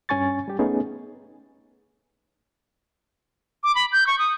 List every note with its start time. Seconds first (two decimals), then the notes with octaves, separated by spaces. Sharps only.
0.09 G2 C#4 G#5 C#6 A6
0.48 G3 G4
0.59 A3 B3 C#4 D#4 G#4
3.63 D6
3.75 B5
3.92 G6
4.07 C#6
4.19 D#6